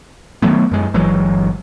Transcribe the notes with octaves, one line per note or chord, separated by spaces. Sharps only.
D#3 F#3 A3 B3
F#2 G#3
G1 E3 F#3 G#3